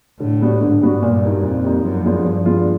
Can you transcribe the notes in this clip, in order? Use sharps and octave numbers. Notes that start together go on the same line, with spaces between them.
A2 D3
G3 B3 D4 F#4
G#2 D3
G3 B3 D4 F#4
G2 A#2
G3 A#3 D#4
F2 A#2
G3 A#3 D#4
F#2 F3
G#3 B3 D4 F4
G2 F3
G#3 B3 D4 F4